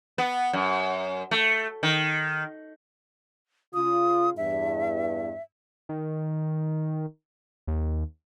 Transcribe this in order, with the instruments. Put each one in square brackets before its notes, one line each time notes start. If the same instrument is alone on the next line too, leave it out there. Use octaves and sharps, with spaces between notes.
[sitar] B3
F#2
A3
D#3
[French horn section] C#3 F4 [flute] D#6
[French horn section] E2 G2 [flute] E5
[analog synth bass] D#3
D#2